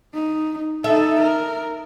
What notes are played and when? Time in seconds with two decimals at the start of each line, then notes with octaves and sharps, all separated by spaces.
0.14 D#4
0.84 D#4 A4 E5
1.21 A#4